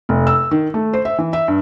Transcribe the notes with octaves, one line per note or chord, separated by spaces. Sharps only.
F1
E6
D#3
A3
C5
E5
E3
E5
G2